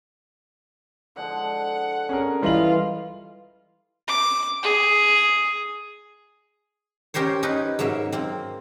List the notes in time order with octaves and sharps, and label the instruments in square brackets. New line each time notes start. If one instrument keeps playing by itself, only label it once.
[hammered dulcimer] D3 F3 G#3 [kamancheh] F#5
[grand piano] C#4 G#4 A#4
[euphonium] E3 [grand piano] G3 D#5 F#7 [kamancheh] F4 F5
[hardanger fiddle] D6
G#4
[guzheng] C#4 G4 A#4 C5 C#5
C#4 D#4 B4
G#2 F#3 A#3 E5
A#3 C4